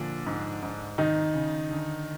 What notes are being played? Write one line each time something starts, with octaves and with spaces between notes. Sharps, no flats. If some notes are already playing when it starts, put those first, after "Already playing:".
Already playing: A#2 D3 F3 D4
G#2
G#2
F2 D#3 D#4
C#3
D3